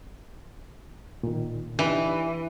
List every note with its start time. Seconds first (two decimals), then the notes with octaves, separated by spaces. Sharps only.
1.23 A#2 D#3
1.79 E3 D4 D#4 G4